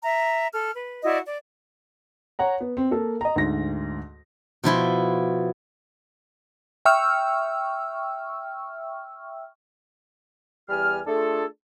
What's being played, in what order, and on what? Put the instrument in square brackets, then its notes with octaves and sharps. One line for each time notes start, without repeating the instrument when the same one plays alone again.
[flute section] E5 A#5
A4 F6
B4
E4 F#4 D5 D#5
D5
[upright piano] C#5 F#5 A#5
B3
C4
A#3 A4
D#5 A#5
D2 G#2 A#6
[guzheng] B2 F3 E4 C6
[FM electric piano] E5 G5 C#6 E6 F6
[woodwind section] E2 G3 G4 G#5 F6
A3 D4 F4 G#4 A4